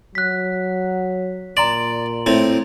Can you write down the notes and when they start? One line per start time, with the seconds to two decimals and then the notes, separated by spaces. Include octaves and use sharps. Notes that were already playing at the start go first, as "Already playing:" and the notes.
0.15 F#3 F#6 B6
1.57 A#2 D5 A#5 C6 F#7
2.26 A2 C4